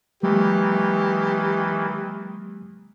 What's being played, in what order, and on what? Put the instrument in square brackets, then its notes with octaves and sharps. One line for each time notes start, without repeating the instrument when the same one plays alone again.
[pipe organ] D#3 E3 [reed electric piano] F#3 G#3 A#3 [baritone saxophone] G4